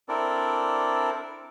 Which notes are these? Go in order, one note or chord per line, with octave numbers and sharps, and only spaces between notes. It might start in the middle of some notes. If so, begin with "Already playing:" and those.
C4 D4 E4 A4 A#4 D5